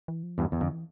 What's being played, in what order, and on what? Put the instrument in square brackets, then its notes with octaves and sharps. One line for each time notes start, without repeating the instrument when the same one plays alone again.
[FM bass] E3
F3
[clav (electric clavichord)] E2 G2 [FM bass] E3
[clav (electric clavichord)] E2 [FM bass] D3
[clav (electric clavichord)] F2 [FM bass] D3
[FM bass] E3